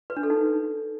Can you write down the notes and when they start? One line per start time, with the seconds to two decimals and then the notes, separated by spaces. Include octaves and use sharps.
0.10 B4
0.17 D4
0.23 A4
0.30 D#4